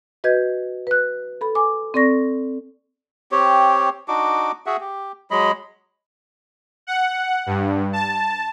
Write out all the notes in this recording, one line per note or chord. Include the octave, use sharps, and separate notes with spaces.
F#4 B4 D#5 G6 G#6
B4 F#6
A4 B5
G#5 D6
C4 A4 D5 C#6 A#6
C4 G4 C#5
D4 D#4 F#4 D6
F#4 G#4 E5 F#5
G4
F#3 G#3 D#5 B5
F#5
G2
A5